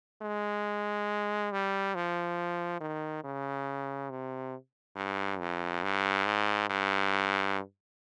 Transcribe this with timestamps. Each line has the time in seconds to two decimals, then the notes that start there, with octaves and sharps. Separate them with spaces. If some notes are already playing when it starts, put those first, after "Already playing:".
0.22 G#3
1.52 G3
1.95 F3
2.80 D#3
3.24 C#3
4.10 C3
4.96 G2
5.39 F2
5.83 G2
6.26 G#2
6.70 G2